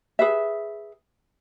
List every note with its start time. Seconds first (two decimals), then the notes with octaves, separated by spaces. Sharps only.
0.19 G#4 B4 E5